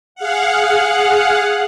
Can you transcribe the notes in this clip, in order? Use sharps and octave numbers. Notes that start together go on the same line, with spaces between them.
G#4 F5 F#5